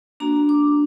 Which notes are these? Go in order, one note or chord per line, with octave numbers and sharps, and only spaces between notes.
A#3 D4 F#4 A#5
D6